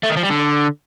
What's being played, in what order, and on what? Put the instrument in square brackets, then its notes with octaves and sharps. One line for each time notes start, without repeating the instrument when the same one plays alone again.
[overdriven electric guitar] A3
D#3
F3
G3
D3